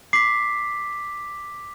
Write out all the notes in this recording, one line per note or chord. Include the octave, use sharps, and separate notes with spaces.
D6 B6 C7